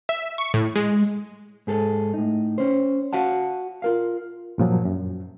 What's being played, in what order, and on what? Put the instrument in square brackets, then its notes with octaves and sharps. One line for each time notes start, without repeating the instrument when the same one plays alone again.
[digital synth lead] E5
C#6
A2
G#3
[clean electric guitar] G#2 G#4 A4
A2 D#4
C#4 C5
F#4 F5 F#5 A5
F4 A#4 F5
[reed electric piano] G2 A#2 F3 F#3
F#2